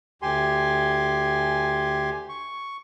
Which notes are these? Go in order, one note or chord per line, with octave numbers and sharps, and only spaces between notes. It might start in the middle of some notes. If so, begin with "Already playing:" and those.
D2 G4 G#5 C6
C#6